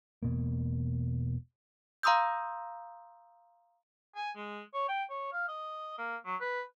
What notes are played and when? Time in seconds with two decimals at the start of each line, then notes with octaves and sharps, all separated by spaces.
0.23 E1 B2 A#3
2.03 F5 A#5 C6 D#6 E6 G6
4.16 G#5
4.37 G#3
4.74 C#5
4.88 G5
5.10 C#5
5.33 F5
5.48 D#5
5.98 A#3
6.25 F#3
6.41 B4